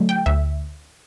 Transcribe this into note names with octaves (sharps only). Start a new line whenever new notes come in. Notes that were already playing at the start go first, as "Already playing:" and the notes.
Already playing: D3 F#3 A3
G5
D2 E5